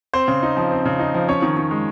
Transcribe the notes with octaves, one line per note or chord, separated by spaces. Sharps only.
C4 C5
C#3
D#4
F3
C4
C#3
D#4
F3
C#4 C#5
D#3
D#3
G#3